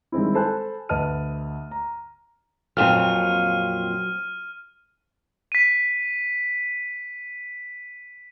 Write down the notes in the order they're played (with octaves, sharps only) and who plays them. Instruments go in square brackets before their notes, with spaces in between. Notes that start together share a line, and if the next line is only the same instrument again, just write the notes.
[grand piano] D#3 G3 G#3 C4 E4
A4 C5 G#5 A5 B5 F#6
D2 B4 D#5 A5 F6 D#7
A#5
[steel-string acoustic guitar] F2 A#2 F4 [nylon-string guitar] F#3 C4 [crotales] F6 D#7
[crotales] B6 D#7